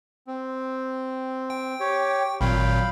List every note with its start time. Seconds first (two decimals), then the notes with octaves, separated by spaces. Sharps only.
0.27 C4
1.50 G5
1.80 G4 C#5
2.41 G#1 A#2 F#3 F5 G5 B5